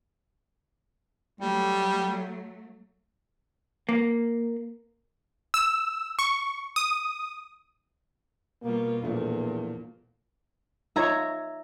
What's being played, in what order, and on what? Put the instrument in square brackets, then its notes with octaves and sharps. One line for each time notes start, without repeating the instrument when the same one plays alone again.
[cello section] F#3 A3 [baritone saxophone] G3
[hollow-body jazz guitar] A#3
[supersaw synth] E6
C#6
D#6
[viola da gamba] B2 G3 F4 [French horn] A#3
[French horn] E2 [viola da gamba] A#2 [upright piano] F3 A3 D4
[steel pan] D#4 F4 C#5 [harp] E5 A#5 G#6